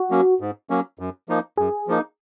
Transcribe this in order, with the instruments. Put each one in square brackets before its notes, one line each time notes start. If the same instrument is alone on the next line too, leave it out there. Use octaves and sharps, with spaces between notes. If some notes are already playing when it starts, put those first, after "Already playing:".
Already playing: [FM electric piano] F#4
[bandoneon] F#3 A#3 C#4
G#2
F#3 A#3 C#4
F#2
F3 A#3 D#4
[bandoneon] F#2 [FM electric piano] G#4
[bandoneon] F3 A#3 D#4